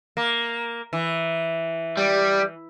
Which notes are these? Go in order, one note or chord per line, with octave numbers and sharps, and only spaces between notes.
A#3
E3
G3